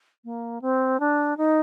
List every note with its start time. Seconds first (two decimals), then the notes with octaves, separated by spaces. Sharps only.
0.25 A#3
0.62 C4
1.00 D4
1.37 D#4